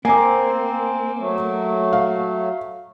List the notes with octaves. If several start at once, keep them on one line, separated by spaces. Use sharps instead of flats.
A#3 C4 G#5 A#5 D6
F#3 A3
F5